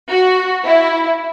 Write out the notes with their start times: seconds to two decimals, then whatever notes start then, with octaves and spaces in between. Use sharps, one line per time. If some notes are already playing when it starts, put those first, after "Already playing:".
0.11 F#4
0.65 E4